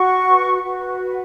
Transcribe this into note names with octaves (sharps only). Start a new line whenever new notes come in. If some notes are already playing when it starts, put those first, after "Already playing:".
Already playing: F#4 C#6
B4
F#4
B4